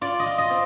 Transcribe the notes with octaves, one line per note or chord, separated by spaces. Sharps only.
F4 D5
D#5
F4
D#5
C4